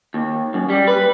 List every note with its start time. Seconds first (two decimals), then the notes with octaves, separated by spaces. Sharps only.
0.14 D#2
0.54 F#2
0.70 G3
0.88 B4